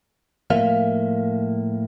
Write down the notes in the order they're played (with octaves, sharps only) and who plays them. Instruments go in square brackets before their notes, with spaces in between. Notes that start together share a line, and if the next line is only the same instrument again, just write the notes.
[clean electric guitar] A2 F3 A#3 E5 F5